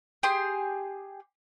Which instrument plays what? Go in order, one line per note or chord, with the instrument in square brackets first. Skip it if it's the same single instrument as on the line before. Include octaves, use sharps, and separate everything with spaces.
[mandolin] G4 G#4 C6 D#6